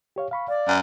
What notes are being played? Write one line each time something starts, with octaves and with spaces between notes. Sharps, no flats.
G4 C#5 F5
F5 B5 C#6
D5 F5
F#2